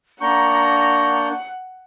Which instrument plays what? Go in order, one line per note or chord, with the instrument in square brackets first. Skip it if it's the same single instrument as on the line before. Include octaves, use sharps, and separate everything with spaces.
[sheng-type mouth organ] A#3 D4 G6 [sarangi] F#5 [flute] A#5 [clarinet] C#6